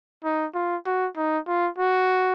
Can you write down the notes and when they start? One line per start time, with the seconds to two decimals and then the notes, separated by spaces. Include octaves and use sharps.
0.24 D#4
0.54 F4
0.86 F#4
1.16 D#4
1.47 F4
1.78 F#4